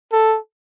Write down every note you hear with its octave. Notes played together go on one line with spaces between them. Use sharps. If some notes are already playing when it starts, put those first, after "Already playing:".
A4